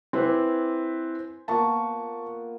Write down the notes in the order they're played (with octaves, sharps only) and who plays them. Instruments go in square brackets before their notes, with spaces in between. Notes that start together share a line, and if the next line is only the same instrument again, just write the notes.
[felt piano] C4 E4 B4 [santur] C5 G#5 D6
[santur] A#3 B3 F4 [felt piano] A5 C#6